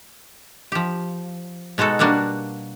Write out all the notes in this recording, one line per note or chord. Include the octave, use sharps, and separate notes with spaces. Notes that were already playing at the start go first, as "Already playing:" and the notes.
F3 G4
B2 G#3 D#4 F#4 A4
B2 G3 A#3 D4 F#4